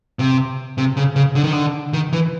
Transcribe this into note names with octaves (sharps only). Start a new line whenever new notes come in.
C3
C3
C#3
C#3
D3
D#3
D3
D#3
E3